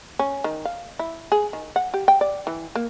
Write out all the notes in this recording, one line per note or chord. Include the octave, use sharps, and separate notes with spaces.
C#4
D#3
F5
E4
G#4
D#3
F#5
G4
G5
D5
E3
A#3